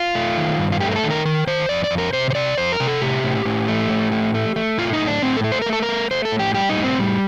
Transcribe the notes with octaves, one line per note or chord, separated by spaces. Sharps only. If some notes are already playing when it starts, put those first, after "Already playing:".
Already playing: F4
A3
D#3
G2
F4
A3 G4
A#4
A4
D#3
A#4
D#3 A#4
D#3 C5
F2 D5
D5
F2
A#4
C3 C5
C5
C3 D5
F2 C5
A#4
C3
A4
A2 G4
A2
A2
A3
A2
A3
A3
A3
A2 F4
D#4
A2
D4
A2 C4
A4
A3
C5
A3 A#4
A4
A#4
A3
A3 C5
A4
A2
G4
G3 G4
D#4
A2
C4
G3